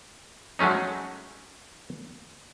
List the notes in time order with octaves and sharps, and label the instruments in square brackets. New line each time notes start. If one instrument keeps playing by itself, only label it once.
[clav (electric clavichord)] F#3 G#3 A3 C#4 D#4